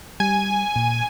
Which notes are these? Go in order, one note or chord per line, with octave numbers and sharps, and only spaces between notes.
G3 G#5
A#2